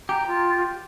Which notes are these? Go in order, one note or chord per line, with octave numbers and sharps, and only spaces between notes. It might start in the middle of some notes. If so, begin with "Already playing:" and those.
G4 A#5
F4